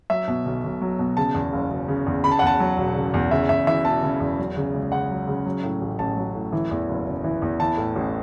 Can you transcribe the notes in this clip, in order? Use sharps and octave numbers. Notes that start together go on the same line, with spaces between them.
F#3 E5
B2
B1
B1
F#3
B2
C#3 A5
E2
F#1
F#1
C#3
E2
C#3 B5
A5
F#5
E2 A5
F#3
E1
C#3
E2
C#3 E5
E2 E5
E3 E5
E1 A5
C#3
E2
F#3
C#3
C#2
C#2 F#5
F#3
C#3
F#3
A2
A1
A1 A5
F#3
A2
E3
E2
F#1
F#1
E3
E2
E3 A5
A2
A1